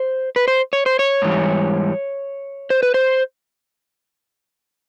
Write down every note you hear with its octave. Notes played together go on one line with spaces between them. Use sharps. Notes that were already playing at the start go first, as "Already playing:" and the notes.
Already playing: C5
B4
C5
C#5
C5
C#5
G#2 E3 G3
C5
B4
C5